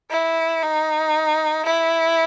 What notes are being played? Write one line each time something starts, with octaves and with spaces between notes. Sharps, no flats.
E4
D#4
E4